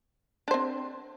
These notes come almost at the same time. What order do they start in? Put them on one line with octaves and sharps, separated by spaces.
D4 C5 C4